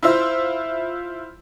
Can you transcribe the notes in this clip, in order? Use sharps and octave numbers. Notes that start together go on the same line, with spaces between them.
E4 F4 C5 E5